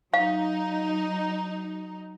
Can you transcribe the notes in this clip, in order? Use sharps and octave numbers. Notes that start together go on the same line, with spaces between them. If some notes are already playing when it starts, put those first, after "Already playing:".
F#3 D#4 F5